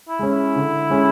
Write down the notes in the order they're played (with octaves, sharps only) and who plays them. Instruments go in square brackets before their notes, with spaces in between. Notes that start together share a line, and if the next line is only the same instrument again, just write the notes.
[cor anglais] E4
[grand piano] G#3 C#4
[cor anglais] E4
[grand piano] D3
G#3 C#4